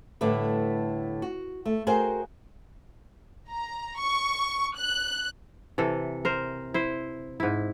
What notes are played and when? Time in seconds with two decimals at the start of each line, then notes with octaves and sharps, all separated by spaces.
0.21 A2 D3 G3 A3 B4
1.22 F#4
1.66 A3
1.87 F#4 G#4 A#4 C5 F5 G5
3.50 A#5
3.98 C#6
4.77 F#6
5.78 C3 E3 A4
6.25 A#4 C5
6.74 E4 C5
7.40 G#2 E4